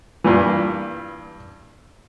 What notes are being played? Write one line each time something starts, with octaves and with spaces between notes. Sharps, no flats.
G2 A#2 E3